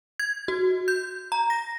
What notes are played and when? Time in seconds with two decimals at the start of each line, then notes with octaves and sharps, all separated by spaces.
0.20 G#6
0.48 F#4
0.88 G6
1.32 A#5
1.50 A#6